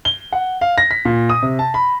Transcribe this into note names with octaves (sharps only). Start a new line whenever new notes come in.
G7
F#5
F5
A#6
B6
A#2
D#6
C3
A5
B5